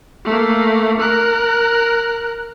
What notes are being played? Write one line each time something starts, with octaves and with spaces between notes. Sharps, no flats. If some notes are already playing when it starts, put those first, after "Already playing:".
A3 A#3
A#4 F#6